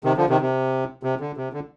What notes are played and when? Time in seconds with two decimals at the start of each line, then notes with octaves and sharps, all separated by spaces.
0.04 C3 D#3
0.17 D3 F3
0.29 C3 D#3
0.41 C3
1.03 C3
1.20 D3
1.37 C3
1.53 D3